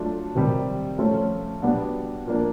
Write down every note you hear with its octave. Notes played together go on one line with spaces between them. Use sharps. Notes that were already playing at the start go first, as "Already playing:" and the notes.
Already playing: F#3 A3 D4 F4
C3 D#3 G3
F3 A3 C#4 F4
G3 B3 D4 F#4
F3 A#3 D4